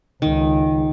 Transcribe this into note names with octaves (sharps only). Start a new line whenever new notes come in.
C#2 D#3